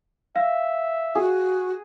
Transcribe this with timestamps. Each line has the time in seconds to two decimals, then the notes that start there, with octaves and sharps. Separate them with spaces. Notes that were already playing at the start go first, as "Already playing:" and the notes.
0.36 E5 F5
1.15 F#4 G#4